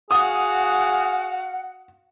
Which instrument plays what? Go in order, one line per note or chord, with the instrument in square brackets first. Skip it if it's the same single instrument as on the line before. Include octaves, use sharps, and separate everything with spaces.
[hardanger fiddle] F#4 F5 [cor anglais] G#4 [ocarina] F#5 [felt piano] D#6